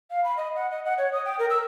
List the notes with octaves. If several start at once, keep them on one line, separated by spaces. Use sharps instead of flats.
F5
B5
D#5
F#5
D#5
F#5
C#5
D#6
G5
A#4
E6